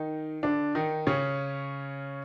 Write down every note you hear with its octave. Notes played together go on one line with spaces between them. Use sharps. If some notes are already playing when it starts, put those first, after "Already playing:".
Already playing: D#3 D#4
D3 D4
D#3 D#4
C#3 C#4